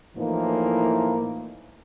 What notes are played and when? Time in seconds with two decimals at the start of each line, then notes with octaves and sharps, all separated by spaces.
0.15 A2 E3 F3 A#3 D#4